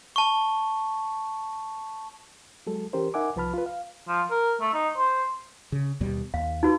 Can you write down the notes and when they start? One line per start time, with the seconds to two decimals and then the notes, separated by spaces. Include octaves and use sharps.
0.16 A5 C#6
2.67 F#3 G#3 A4
2.93 E3 C#4 G4 A#4 C5
3.14 D#4 A#4 E5 F#5 G#5 D6
3.36 C2 F3 B4 A5 B5 F6
3.54 F4 B4
3.66 F5
4.08 F3
4.31 A#4
4.61 A3
4.73 D#4
4.97 C5
5.72 C#3
6.01 D#2 B2 G3
6.34 D#2 F5
6.63 D#4 F#4 B4